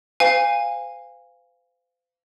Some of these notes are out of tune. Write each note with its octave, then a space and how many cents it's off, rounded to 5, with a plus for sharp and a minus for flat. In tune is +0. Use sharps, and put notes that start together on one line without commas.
C5 -40 F5 +0 G#5 -25